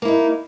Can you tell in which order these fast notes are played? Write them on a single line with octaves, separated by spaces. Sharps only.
A#3 E4 D#4